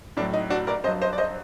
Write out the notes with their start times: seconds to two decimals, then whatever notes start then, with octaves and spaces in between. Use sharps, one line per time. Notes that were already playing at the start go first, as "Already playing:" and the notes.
0.17 A2 D4
0.21 F#3
0.33 D#4
0.50 D4 F#4
0.67 A#4 D5
0.84 G2 C5 D#5
0.87 F#3
1.02 C5 D#5
1.13 D5
1.18 C5 D#5